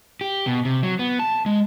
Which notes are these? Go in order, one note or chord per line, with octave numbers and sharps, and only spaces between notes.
G4
B2
C3
F#3
B3
A5
G#3